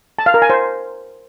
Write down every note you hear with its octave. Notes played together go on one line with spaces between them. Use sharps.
A5
F5
A#4
G#5
C5